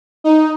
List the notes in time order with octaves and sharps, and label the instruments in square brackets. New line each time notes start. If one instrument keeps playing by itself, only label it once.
[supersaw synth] D#4